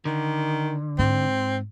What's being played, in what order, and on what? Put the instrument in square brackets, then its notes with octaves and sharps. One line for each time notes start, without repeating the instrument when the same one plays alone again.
[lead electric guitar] D3 [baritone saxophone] D#3
[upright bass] G#2 [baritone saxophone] C4